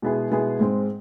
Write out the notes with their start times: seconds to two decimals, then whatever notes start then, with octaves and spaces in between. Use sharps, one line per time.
0.02 B2 G#3 B3 E4 G#4
0.30 B2 G#3 B3 E4 G#4
0.60 G#2 G#3 C4